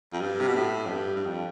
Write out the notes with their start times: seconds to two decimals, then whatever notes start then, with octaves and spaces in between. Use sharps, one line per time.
0.13 F2
0.21 G2
0.40 C3
0.48 B2
0.56 A2
0.86 F2
0.91 G2
1.16 G2
1.26 F2